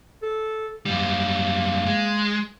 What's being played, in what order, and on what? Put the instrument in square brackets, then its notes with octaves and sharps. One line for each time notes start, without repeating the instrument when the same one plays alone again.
[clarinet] A4
[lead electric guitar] F#2 G3 [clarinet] A#3
[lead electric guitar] G#3